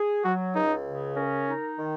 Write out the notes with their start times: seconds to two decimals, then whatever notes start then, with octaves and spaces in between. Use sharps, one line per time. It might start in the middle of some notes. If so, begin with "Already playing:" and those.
Already playing: G#4
0.24 F#3 F#4
0.55 C#2 D#4
0.85 C#3
1.16 C#4 A#4
1.47 D#4
1.78 D#3